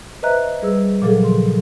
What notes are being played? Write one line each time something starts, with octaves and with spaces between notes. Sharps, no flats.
B4 C5 D#5 E5 A#5 F#6
G3 G#4 B4 E6
A#2 C#3 F3 F#3 G#4 A4
C6